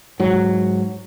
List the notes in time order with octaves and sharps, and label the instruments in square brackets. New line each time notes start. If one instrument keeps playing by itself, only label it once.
[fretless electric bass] G#2 F#3